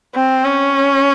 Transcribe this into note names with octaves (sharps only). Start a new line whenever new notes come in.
C4
C#4